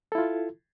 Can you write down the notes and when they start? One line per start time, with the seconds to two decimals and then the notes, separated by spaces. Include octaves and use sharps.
0.12 A4
0.15 E4
0.18 F4